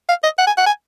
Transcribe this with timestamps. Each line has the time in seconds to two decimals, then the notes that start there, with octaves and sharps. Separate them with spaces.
0.09 F5
0.24 D#5
0.38 F#5
0.47 G#5
0.57 F#5
0.66 G#5